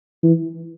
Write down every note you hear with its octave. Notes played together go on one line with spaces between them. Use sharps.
E3